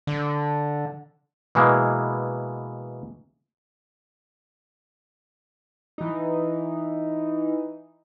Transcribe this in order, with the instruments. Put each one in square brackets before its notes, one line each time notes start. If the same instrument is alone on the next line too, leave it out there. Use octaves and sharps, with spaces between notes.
[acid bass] D3
[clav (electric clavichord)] B2 E3 G#3 A#3
[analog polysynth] E3 D#4